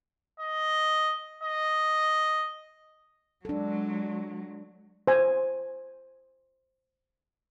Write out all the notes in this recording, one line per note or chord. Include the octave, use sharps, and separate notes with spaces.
D#5
D#5
F#3 G#3 D4 A4
C5 G#5